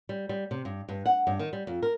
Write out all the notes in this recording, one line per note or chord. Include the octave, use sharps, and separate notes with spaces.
G3
G3
C3
G2
G2
F#5
G2
D#3
G3
F2
A#4